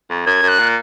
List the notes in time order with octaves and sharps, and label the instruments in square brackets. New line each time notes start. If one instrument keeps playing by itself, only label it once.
[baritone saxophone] F2
[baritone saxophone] F#2 [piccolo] G#6
[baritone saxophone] F#2
[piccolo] F#6
[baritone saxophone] A#2